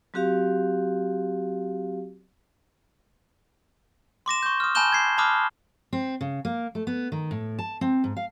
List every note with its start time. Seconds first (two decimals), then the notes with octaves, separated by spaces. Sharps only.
0.14 F#3 C4 F#4 G4 F5
4.26 C6 D6 A#6 E7
4.43 C#6 G6
4.60 D#6 F6
4.75 G#5 A5 B5 G6 E7 G7
4.92 G#6 C7
5.18 A5 B5 D6 D#6 F6 F#6
5.93 C4
6.21 C#3
6.45 A#3
6.75 A3
6.87 B3
7.12 D#3
7.31 A2
7.59 A5
7.81 C4
8.04 G#2
8.16 F5